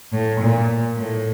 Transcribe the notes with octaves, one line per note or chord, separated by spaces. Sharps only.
A2
A#2
A2